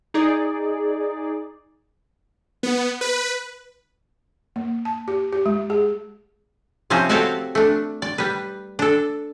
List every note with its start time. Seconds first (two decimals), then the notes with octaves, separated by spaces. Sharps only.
0.14 D#4 G#4 D5
2.63 B3
3.01 B4
4.56 A#3
4.85 A5
5.08 G4
5.33 G4
5.46 G#3
5.70 G#4
6.90 C3 F3 C#4 F#4 C5
7.09 C4 F#4 G4 A4 C#5 F5
7.55 A3 D4
8.02 D5
8.18 G3 B4
8.79 D4 A4